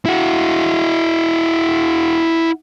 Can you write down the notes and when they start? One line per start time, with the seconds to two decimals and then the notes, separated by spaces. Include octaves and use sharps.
0.06 E4 F#4